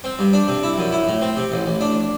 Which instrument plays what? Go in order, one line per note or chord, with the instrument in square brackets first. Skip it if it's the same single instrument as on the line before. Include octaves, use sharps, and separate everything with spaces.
[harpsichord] C4
G2
D4
C3
E4
F#2
E4
A2
C4
C3
A1
A1
D4